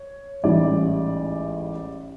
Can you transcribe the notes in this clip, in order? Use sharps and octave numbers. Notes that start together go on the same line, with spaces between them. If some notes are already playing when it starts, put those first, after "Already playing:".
Already playing: C#5
A1 G#2 E3 G3 D5